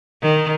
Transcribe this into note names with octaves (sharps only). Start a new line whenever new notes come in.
D#3